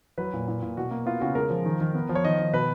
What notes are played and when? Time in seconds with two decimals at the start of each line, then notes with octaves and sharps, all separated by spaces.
0.18 F#3 B4
0.33 A#2
0.48 A#2
0.62 A#2
0.77 B2 F#4
0.91 A#3
1.06 B3 F4
1.21 C#3 F#4
1.35 G#3 A#4
1.50 F3
1.65 D#3
1.81 D#3
1.94 B3
2.09 F3
2.15 C#5
2.25 D#3 D#5
2.39 D#3
2.53 B2 B4